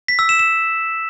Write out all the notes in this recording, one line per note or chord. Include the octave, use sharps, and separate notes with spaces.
B6
E6
E7
E7